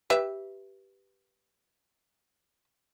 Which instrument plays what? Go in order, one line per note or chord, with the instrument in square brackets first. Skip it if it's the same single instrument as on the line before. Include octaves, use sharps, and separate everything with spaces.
[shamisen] G4 B4 E5